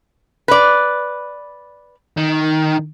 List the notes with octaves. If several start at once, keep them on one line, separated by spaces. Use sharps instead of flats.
B4 D5
D#3